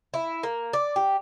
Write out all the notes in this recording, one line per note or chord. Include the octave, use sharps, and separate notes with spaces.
E4
A#3
D5
G4